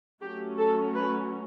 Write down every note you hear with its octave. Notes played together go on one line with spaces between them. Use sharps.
F#3 A3 C#4 G4
A4
B4